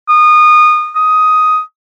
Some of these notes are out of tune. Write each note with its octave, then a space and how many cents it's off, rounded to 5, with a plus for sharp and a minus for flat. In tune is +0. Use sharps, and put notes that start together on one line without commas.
D#6 -25
D#6 +10